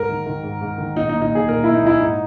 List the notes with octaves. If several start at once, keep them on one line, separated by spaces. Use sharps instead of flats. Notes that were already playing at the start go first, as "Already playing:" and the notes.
Already playing: G#2 A#4
D#3
D#3
G#2
G#2
D#3
A#2 D#4
D#4
A#2
D#4
A#2 G#4
A#2 A#4
A#2 E4
D#4
A#2 E4
G#2 D#4